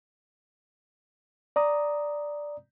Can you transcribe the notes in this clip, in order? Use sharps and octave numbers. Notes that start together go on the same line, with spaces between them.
D5 A#5 D#6